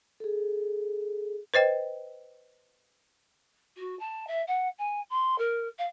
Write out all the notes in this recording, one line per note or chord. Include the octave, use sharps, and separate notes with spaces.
G#4 A4
B4 C5 D#5 G5
F#4
A5
E5
F#5
G#5
C6
A#4
F5